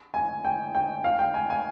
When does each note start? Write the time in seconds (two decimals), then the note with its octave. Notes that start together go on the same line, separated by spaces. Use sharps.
0.14 G#5
0.45 G5
0.75 G5
1.04 F5
1.19 G5
1.34 G#5
1.50 G#5